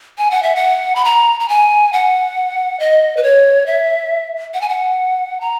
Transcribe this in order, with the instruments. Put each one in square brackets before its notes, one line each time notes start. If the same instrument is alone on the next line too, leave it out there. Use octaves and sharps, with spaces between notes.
[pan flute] G#5
F#5
E5
F#5
B5
A#5
A#5
G#5
F#5
D#5
B4
C#5
E5
F#5
G#5
F#5
A#5